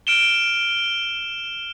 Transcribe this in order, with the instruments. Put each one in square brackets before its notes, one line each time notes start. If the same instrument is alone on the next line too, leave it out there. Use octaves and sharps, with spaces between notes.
[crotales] F6 D7 E7 G7